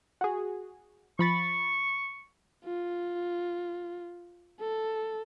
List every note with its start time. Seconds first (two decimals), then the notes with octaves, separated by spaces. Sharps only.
0.21 F#4 G#4
1.19 F3 B5 C#6 A6
2.64 F4
4.60 A4